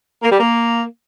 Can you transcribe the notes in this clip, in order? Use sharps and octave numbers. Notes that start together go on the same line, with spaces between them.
A#3
G3
A#3